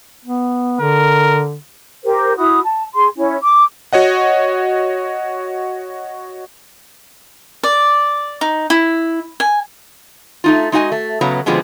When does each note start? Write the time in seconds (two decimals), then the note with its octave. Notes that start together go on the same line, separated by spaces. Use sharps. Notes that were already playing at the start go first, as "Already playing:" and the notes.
0.25 B3
0.81 D3 A#4
2.04 G4 A#4 C5
2.37 E4 F#4 D#6
2.65 A5
2.94 G#4 C6
3.16 C#4 E4
3.42 D6
3.93 F#4 C#5 D#5 F#5
7.63 D5
8.41 D#4
8.70 E4
9.40 G#5
10.44 A3 D#4 F4
10.72 G#3 D#4 F#4 D#5 G5 G#5
10.92 A3
11.21 C#3 F#3 B3 A#5
11.46 B2 D3 F3 G#3 B3 C4